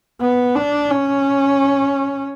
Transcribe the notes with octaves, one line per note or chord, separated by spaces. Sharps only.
B3
D4
C#4